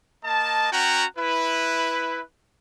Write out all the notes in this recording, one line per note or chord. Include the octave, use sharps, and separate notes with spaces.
A#3 D#5 A5
C#4 F#4 F#5 G5 A#5
E4 B4